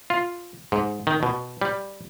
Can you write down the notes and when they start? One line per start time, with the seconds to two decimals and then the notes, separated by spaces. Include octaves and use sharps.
0.10 F4
0.72 G#2
1.07 D#3
1.23 B2
1.62 G3